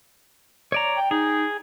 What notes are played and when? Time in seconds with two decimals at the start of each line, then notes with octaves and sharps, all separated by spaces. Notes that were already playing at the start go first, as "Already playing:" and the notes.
0.72 C#5 D5 A#5
0.96 G5
1.11 D#4 G#4